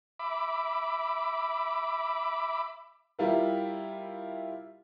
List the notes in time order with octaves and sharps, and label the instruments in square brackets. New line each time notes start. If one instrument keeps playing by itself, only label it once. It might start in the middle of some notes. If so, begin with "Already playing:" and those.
[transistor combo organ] E5 B5 D6
[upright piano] G3 E4 F4 A#4